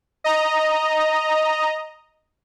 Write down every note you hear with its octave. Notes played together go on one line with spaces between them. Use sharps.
D#5 A#5